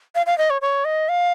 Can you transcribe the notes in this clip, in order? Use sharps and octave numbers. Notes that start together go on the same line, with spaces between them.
F5
F5
D#5
C#5
C#5
D#5
F5